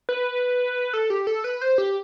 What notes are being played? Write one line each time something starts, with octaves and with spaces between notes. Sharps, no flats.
B4
A4
G4
A4
B4
C5
G4